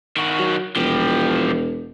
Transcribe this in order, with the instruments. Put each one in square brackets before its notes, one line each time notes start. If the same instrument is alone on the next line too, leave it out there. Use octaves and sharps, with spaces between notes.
[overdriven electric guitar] D#3 F#4
[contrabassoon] F#3
[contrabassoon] E1 [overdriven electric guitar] F3 G4